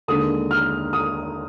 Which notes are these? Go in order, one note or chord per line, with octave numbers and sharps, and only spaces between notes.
D#2 D3 G#3 D#6
F6
D#6